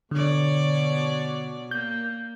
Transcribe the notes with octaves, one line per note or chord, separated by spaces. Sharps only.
B2 D3 C#5 D5
A#3 G6